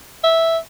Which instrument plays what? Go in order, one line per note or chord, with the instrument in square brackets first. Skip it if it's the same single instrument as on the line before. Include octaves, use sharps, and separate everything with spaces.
[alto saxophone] E5